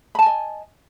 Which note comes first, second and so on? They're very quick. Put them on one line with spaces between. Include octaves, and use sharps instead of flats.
B5 A5 G#5 D#5